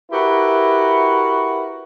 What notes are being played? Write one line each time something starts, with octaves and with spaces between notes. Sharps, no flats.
E4 F#4 G4 A#4 B4